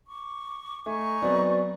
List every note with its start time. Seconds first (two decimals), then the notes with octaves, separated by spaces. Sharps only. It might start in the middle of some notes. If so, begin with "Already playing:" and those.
0.07 C#6 D6
0.86 A3 D#4 G#5 C#6
1.22 F#3 B3 C4 D5